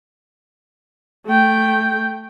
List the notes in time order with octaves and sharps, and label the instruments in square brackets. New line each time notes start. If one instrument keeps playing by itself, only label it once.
[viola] A3 G5